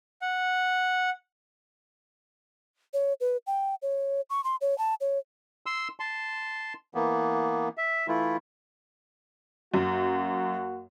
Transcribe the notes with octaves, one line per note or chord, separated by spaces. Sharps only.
F#5
C#5
B4
G5
C#5
C#6
C6
C#5
A5
C#5
C6 E6
A5 C6
E3 A#3 B3
E5
E3 A3 E4 F4
F#2 A#3 F#4